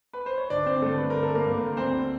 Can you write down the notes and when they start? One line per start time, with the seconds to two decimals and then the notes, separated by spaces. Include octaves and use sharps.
0.13 B4
0.26 C5
0.38 C#5
0.50 G1 D4 D5
0.66 C4 C5
0.82 G2 D3 A3 A4
0.98 B4
1.10 G1 A#4
1.23 A4
1.35 A#3 A#4
1.45 G2 D3
1.77 D2 C4 C5